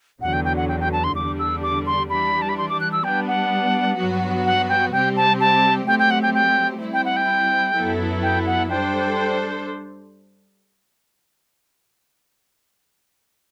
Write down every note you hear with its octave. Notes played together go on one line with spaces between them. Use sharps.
E2 D3 F#3 F#5
G5
G5
F#5
G5
G5
A5
C6
E2 D3 G3 D4 D6
E6
D6
C6
E3 G3 D4 B5
A5
B5
C6
D6
F#6
E6
G3 B3 D4 G5
F#5
G2 F#3 B3 F#4
F#5
G5
C3 G3 C4 G4 G5
A5
A5
F#3 A3 C4 G4 G5
G5
F#5
G5
G5
G3 C4 E4
G5
F#5
G5
F#2 F#3 B3 E4 A4
G5
F#5
G3 D4 A4 C5 G5